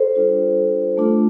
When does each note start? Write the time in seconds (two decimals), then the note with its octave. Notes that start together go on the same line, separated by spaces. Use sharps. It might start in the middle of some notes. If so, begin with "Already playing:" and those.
Already playing: A4 C5
0.15 G3 D4 F4
0.97 A3 D4 F4